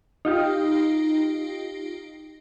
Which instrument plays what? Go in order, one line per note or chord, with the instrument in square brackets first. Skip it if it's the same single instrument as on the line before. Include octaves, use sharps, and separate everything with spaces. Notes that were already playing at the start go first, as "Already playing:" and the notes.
[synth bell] D#4 F4 G4